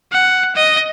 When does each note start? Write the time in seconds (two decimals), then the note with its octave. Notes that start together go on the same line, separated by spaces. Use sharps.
0.12 F#5
0.56 D#5